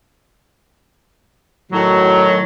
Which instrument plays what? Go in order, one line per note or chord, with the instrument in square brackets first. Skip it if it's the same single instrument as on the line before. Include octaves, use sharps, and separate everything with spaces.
[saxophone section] A2 D#3 F#3